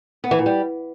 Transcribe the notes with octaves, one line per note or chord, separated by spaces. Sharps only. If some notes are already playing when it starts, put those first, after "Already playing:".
B3
E3
A#2
G3